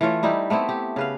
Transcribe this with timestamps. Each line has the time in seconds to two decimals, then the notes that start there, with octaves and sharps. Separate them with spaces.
0.01 E3 A3 F4 C#5
0.23 G3 D#4 E4 G4
0.50 A3 B3 C4 E4
0.69 G4
0.96 C#3 B4 F5